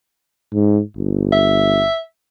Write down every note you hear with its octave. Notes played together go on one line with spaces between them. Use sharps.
G#2
G1
E5